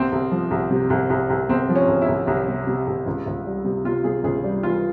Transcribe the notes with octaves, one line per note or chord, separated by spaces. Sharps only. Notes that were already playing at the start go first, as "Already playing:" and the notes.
Already playing: C2 C4
C2
F3
C2
C3
C2
C2
C2
C2 C4
F3
C#4
C2
E4
C2
C2
C3
C3
C2
C#2
C#2
G3
C3
C3 F4
C3 G#4
C#2 G#4
G3
E3 F4